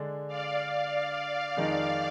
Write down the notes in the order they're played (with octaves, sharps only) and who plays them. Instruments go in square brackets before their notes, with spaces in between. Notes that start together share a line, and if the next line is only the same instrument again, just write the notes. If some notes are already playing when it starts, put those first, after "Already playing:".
Already playing: [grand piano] D3 G#3 D4
[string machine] D5 F5
D5 F5
[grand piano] F2 D#3 G#3 D#4